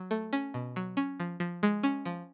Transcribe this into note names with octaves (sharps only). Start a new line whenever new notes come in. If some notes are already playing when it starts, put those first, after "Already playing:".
Already playing: F#3
A3
C#4
B2
F#3
C#4
F3
F3
G#3
C#4
F3